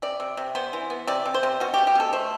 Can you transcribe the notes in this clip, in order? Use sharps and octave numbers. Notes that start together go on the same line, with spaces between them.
C3 D5
C3
C3
B3 C5
E3
B3
C3 D5
C3
C5
C3
B2 F#4
G4
A3
G4
B2 A4
A3 C5